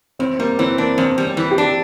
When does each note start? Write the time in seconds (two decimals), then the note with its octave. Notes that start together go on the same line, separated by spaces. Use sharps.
0.19 E2 C4
0.39 G3 A#3
0.59 E3 C4
0.78 A#3 D4
0.98 E2 C4
1.18 G3
1.25 C4
1.37 E3
1.51 G4
1.58 D4